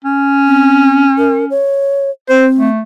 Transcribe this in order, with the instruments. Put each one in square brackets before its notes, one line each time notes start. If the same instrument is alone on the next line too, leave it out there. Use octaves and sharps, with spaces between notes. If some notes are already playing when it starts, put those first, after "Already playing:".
[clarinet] C#4
[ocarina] C4
A#4
C#5
[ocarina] C4 [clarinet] C5
[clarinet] A3